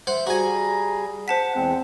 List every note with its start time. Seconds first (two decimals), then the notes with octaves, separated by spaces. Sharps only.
0.07 C5 E5 F#5
0.27 G3 F#4 G#4 G#5 A#5
1.28 C5 F#5 A5 B6
1.55 E2 G#3 C4